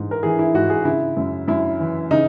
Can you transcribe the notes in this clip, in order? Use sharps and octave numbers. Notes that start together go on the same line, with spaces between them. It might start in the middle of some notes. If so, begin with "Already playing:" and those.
Already playing: G#2 E3
A#4
E3 G#4
E4
G#2 F#4
G#4
C#3 E4
F#2
F#2 E4
E3
C#3 D#4